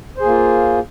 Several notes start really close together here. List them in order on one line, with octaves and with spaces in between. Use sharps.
C5 G#4 A#3 F4